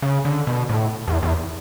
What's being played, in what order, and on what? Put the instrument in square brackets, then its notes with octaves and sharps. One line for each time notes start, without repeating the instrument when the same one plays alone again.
[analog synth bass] C#3
D3
B2
A2
E2
E2